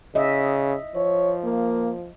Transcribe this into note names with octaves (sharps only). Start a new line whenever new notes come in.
C#3 D#5 E5
F3 C#5
A#3